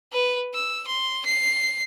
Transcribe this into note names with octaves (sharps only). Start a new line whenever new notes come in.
B4
E6
C6
C7